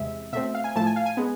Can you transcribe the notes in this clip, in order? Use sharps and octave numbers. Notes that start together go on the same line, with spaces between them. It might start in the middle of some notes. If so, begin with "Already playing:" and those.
Already playing: E2 C3 G#3 E5
B2 A3 C4 E5
F5
G#5
A2 F3 A3 A5
G#5
F5
G#5
G#3 B3